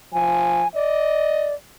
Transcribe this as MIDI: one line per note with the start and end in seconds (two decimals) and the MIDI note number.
0.13 0.62 53
0.13 0.68 80
0.75 1.54 74
0.75 1.53 75